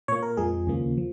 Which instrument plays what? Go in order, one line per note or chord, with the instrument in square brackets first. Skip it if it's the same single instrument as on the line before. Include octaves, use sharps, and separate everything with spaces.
[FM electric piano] A#2 A#3 C#5
A#4
F2 F3 G#3 G#4
D#2 C#3 F3 A#3
F3